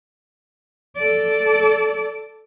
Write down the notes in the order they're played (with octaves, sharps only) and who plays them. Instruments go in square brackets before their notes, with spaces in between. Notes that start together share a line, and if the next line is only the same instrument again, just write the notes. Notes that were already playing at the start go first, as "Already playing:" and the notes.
[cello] A4 D5